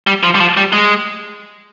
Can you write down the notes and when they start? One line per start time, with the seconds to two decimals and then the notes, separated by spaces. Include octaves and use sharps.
0.07 G3
0.23 F3
0.35 G3
0.40 F3
0.57 G3
0.73 G#3